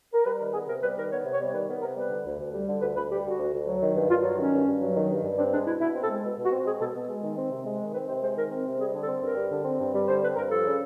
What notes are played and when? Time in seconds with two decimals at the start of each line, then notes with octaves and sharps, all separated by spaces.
0.14 A#4
0.25 G3 B4
0.40 D#3 A#4
0.53 B3 G#4
0.68 C3 A#4
0.82 G3 B4
0.97 D#3 A#4
1.11 B3 C#5
1.25 C3
1.33 C#5
1.40 G3
1.53 D#3 B4
1.68 B3 A#4
1.82 C3 A#4
1.96 G3 B4
2.10 D3
2.25 D2
2.39 D2
2.53 G3
2.68 D3
2.82 D2 B4
2.96 D2 B4
3.10 G3 G4
3.25 D3 F#4
3.39 D2
3.53 D2
3.67 F#3
3.81 D#3
3.95 G2
4.10 G2 F4
4.24 F#3
4.38 D#3 C#4
4.52 G2
4.67 G2
4.81 F#3
4.96 D#3
5.10 G2
5.24 G2
5.38 C4 D4
5.53 G#3 D4
5.67 B2 E4
5.81 B2 E4
5.95 C4
6.02 A4
6.10 G#3
6.24 B2
6.38 B2
6.45 F#4
6.52 C4
6.66 G#3 G#4
6.80 B2 A4
6.95 B2
7.09 G#3
7.23 D#3
7.37 C4
7.51 C3
7.66 G#3
7.81 D#3
7.94 C4 B4
8.08 C3 C5
8.22 G#3 C5
8.37 D#3 A#4
8.51 C4
8.66 C3
8.80 G3 G#4
8.94 D3
9.02 A4
9.08 C4
9.22 G2 A#4
9.37 G3
9.51 D3
9.65 C4
9.79 G2
9.94 G3
10.08 D3 C5
10.22 C4 B4
10.36 G2 A#4
10.50 F3 A4
10.65 C#3